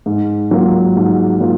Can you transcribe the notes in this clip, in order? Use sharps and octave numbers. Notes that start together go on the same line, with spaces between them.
G#2
F#3 A#3 F4
G#2
F#3 A#3 F4